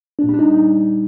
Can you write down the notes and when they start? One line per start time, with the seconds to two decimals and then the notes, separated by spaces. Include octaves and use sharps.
0.19 D4
0.24 A#2
0.29 G3
0.34 D4
0.39 D#4